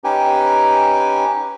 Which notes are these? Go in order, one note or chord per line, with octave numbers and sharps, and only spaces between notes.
C#4 D#4 G4 B4 G5 G#5